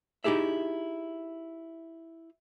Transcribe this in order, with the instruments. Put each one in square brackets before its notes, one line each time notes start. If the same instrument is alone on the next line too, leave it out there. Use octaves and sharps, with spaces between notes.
[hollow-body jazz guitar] D#4 E4 G4 G#4 E5